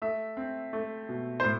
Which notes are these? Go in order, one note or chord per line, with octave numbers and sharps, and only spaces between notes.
A3 E5
C4
A3
B2
C5
A2